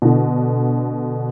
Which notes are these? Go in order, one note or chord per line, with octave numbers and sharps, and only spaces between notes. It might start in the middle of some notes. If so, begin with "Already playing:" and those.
B2 D3